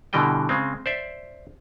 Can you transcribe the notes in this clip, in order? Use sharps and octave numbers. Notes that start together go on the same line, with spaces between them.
B2 D3 E3 G3 D#5 G5
C#3 G#3 C4
C5 D5 E5